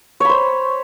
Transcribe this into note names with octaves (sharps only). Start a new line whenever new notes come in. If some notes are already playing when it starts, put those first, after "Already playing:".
C5 C#5 B5